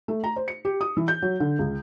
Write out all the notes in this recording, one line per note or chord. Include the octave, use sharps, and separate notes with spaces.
A3
A#5
C5
C#7
G4
D#6
E3
G6
F#3
D3
C#2